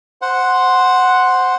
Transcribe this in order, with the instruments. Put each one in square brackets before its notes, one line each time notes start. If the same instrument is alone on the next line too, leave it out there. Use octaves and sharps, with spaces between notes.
[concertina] C5 F#5